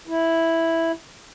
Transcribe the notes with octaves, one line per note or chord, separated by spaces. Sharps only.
E4